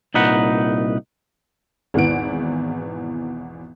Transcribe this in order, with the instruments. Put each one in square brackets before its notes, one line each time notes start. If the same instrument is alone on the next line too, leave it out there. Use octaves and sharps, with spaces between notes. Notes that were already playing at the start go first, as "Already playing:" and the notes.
[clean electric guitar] C2 A#2 D#4 B4 F#5
[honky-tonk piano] G#1 E2 B2 E3 F#5 D7